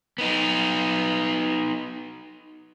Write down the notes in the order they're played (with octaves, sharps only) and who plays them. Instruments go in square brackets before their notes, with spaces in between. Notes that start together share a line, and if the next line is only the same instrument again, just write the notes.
[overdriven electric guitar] B3 D#4